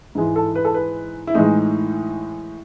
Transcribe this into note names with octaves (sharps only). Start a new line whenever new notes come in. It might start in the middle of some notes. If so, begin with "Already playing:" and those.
G#2 E3 G#3
A4
B4
A4
B4
E4
A2 E3 G#3 D#4